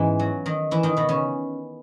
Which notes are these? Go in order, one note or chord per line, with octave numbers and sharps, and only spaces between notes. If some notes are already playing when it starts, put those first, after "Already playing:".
Already playing: G#2 E3 G#3 B3 C#4
F#3
D#3 D#4
E3 E4
D#3 D#4
B2 B3
C#3 C#4